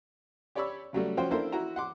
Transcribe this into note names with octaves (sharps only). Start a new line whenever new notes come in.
G4 C#5 D5 B5 C#6 E6
C#3 F#3 G3 A3
F3 C#4 F#4 C5 G5
A#3 D4 E4 A4 A#4 C5
E4 F#4 A#5
F#5 C6 D6